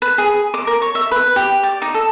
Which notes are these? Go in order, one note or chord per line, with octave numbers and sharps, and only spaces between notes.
B4
G#4
D6
A#4
C#5
E5
B4
G4
D5
D#4
A4